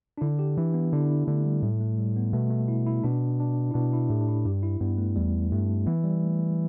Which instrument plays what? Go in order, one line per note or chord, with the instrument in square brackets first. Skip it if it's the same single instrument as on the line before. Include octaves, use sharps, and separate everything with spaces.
[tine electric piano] D4
[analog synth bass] D3 [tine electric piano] E4
[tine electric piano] G4
[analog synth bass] E3 [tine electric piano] D4
[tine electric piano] B3
[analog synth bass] D3 [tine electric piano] E4
[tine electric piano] D4
E4
[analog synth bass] D3 [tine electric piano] A3
[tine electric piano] G3
[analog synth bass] A2 [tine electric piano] G3
[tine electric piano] A3
G3
B3
[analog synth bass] B2 [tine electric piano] A3
[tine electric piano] A3
E4
E4
[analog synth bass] B2 [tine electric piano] D4
[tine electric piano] D4
E4
[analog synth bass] B2 [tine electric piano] D4
[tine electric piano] E4
[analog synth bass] A2 [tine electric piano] G4
[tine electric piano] D4
E4
[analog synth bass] G2 [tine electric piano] G4
[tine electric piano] E4
[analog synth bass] G2 [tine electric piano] B3
[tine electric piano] A3
[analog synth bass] E2 [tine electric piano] G3
[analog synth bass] G2 [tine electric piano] A3
[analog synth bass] E3 [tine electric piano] B3
[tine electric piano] G3
A3